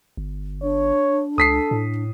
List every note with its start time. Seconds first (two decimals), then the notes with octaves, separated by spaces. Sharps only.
0.17 G1
0.62 D4 C#5
1.38 C#2 A4 D#6 B6 C7
1.71 A2